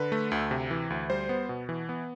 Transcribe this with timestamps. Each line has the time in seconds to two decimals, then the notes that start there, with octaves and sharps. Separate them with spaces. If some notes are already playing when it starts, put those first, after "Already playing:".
Already playing: D3 B4
0.12 A3
0.31 D2
0.51 C3
0.71 E3
0.90 D2
1.10 G3 C5
1.29 B3
1.49 B2
1.69 E3
1.89 B3